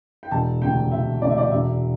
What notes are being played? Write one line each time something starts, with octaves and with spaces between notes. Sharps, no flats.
G5
E1 A5
D2 C3 G5
E1 E5
D2 C3 D5
E5
D5
E1 E5